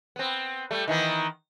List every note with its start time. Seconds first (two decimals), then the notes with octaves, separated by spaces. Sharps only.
0.16 B3 C4
0.71 G3 A3
0.88 D#3 E3 B3